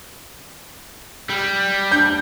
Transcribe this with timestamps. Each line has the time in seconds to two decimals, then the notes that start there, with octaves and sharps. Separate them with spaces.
1.30 G3
1.92 D4 G6